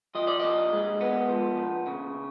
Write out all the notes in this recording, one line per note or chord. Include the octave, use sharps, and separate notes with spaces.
F3 D#5
D5
A#2 D#5
G#3
B3
F3
A#2
C#3